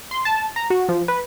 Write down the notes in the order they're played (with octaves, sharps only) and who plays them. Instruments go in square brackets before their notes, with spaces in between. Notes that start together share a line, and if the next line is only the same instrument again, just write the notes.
[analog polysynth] C6
A5
A#5
F#4
F3
B4